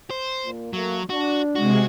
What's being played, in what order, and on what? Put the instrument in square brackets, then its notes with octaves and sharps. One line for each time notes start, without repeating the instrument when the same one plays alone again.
[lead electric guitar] C5
[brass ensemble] A#2
[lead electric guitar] F#3 [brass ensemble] A3 A#3
[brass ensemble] D4 [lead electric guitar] F#4
[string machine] C3 G#3 [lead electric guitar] F#4